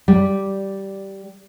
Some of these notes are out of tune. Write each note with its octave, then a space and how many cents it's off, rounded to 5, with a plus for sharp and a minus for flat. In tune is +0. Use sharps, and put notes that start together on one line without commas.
G3 -10